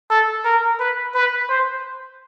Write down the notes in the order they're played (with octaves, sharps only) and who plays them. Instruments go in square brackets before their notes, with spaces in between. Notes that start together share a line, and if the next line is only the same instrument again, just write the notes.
[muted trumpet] A4
A#4
B4
B4
C5